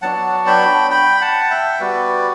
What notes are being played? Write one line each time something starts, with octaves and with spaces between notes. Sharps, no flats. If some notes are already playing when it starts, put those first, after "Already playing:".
F#3 B3 D4 F#4 F#5 A5
G5 B5
G5 B5
F#5 A5
E5 G5
G3 B3 F#4 B4 D5